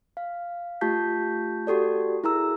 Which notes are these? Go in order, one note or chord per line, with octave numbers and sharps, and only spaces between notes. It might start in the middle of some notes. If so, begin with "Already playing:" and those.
F5
A3 F4 G4 A5 G6 B6
F#4 G4 A4 D5
E4 G#4 A#4 A#5 E6